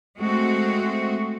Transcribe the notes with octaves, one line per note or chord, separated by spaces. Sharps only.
G#3 A3 C4 F#4